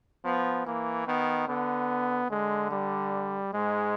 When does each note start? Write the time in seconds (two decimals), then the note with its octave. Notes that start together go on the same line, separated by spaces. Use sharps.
0.24 F3 B3
0.66 E3 A#3
1.07 D#3 B3
1.47 D3 B3
2.30 D3 G#3
2.71 G3
3.53 G#2 G#3